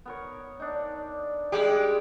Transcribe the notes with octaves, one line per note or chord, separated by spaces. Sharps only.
B3 A#4 C#5
D4 D#4
G3 G#3 G4